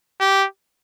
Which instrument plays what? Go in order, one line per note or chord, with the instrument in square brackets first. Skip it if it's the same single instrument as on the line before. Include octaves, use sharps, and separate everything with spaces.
[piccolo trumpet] G4